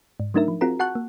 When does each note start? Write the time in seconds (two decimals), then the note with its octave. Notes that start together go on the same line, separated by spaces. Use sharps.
0.20 G#2
0.34 F#3 A3 D4 D#4 A#4 E5
0.48 F3
0.61 C4 F4 F#4 G#4 A#4 A#5
0.79 F#4 F#5 A5 C#6 F#6
0.95 A#3